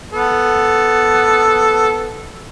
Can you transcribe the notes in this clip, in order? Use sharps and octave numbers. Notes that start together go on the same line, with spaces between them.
B3 A4